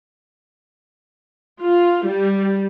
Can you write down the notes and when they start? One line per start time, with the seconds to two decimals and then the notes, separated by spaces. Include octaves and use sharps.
1.62 F4
2.06 G3